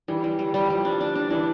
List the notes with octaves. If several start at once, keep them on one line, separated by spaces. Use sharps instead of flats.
E3 G3
G3
G3
G3
F3 G3
D4
D4
D4
E3 D4